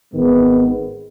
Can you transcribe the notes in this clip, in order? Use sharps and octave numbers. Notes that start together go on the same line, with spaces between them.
G#1 G#2 D#3 G#3 B3